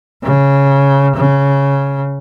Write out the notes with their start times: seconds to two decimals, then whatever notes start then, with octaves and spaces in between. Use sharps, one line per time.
0.23 C#3
1.16 C#3